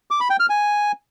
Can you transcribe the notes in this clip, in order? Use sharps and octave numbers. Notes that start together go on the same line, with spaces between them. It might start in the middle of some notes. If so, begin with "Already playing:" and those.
D6
B5
G5
F6
G#5